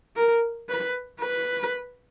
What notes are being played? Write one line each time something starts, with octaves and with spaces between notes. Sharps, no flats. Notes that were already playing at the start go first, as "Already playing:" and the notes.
A#4
B4
B4